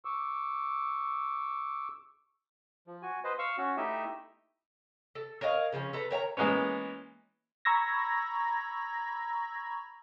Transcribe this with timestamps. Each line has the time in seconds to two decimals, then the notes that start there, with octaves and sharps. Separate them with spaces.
0.05 C#6 D6 E6
2.87 F3
3.03 F#4 G#5
3.24 B4 C5 D#5
3.39 F5 C#6 E6
3.57 C#4 F#4
3.77 A3 D#4 E4 G4 D#5 E5
5.15 A4
5.41 A#4 C#5 D#5 F5
5.72 C#3 F3 A3 C#4
5.93 A4 B4 A#5
6.11 A#4 C#5 F#5 A#5
6.37 E3 G#3 A#3 B3 C#4
7.65 A#5 B5 C#6 E6 G#6 A#6